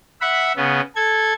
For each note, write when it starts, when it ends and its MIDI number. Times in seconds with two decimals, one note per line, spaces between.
0.21 0.52 76
0.21 0.52 78
0.21 0.52 83
0.57 0.81 49
0.57 0.81 59
0.96 1.33 69
0.96 1.33 92